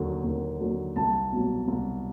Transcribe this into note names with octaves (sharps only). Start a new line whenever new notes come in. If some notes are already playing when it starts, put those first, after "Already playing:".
Already playing: D#2 D3 F#3
D#2
D3 F#3
C2 A5
B2 F#3
C2